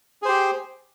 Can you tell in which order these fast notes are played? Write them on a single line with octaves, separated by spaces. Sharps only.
G#4 C5 G4